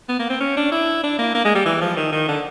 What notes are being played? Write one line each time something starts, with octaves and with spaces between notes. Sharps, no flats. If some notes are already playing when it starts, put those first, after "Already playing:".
B3
A#3
C4
C#4
D4
E4
D4
A#3
A#3
G#3
G3
E3
F3
D#3
D#3
D3